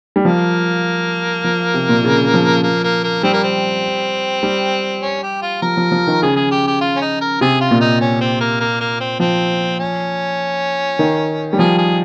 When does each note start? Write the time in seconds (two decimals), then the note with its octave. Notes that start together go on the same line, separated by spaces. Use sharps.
0.16 G3
0.25 F3 A#3
1.44 F3
1.74 C3
1.89 A#2
2.04 C#3
2.34 F3
2.63 A#3
2.84 A#3
3.04 A#3
3.23 G3 C4
3.33 A#3
3.44 C4
4.43 G3
5.02 C#4
5.23 G4
5.42 F4
5.62 F3 A#4
5.77 F3
5.92 F3
6.07 D#3
6.22 C#3 G#4
6.36 G#4
6.51 G4
6.67 G4
6.81 F4
6.96 C#4
7.01 D#4
7.21 A#4
7.41 C3 G#4
7.61 F4
7.71 A#2
7.80 D#4
8.01 C#4
8.21 C4
8.40 A#3
8.60 A#3
8.81 A#3
9.00 C4
9.20 F3 C4
9.79 C#4
10.99 D#3
11.53 G3
11.59 F3 G#4
11.78 G#4